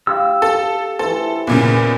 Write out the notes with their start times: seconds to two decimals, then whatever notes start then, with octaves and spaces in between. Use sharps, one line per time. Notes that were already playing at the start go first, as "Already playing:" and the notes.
0.07 G4 F5 E6
0.42 A4
0.99 E3 A4 C5
1.47 E2 A#2 C#3